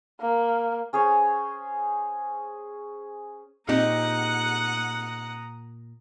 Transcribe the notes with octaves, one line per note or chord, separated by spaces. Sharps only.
A#3
C#4 G#4 C5 C#5
A#2 C4 D#4 G4 F#5 A#5 D#6